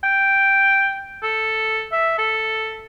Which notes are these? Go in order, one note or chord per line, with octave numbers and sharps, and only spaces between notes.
G5
A4
E5
A4